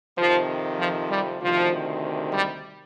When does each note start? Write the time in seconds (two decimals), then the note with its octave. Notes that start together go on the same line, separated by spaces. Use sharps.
0.17 F2 C3 D#3 F3
0.79 F3
1.10 G3
1.41 D2 C3 D#3 F3
2.34 G3